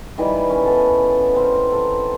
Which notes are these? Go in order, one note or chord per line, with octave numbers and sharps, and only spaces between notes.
D#3 E3 G3 D#5
C#4
B3 A4
C4 A#4
A4